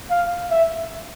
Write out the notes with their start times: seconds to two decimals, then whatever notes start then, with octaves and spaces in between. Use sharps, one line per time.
0.11 F5
0.51 E5